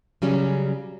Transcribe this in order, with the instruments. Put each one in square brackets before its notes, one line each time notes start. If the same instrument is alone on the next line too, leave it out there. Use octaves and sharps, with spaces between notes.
[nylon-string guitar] C#3 F#3 G3 C#4